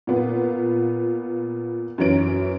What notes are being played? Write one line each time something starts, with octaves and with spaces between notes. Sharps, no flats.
A#2 B3 F4
F#2 E3 C#4 D7